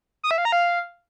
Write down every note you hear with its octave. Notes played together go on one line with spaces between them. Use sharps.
D#6
E5
F5
A#5
F5